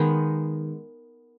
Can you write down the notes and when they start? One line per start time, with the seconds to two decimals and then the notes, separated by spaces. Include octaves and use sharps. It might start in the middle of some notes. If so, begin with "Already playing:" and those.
Already playing: D#3 G#3 B3